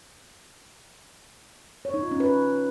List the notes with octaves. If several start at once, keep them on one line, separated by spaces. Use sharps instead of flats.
C#5
D#4
F4
C#4
B4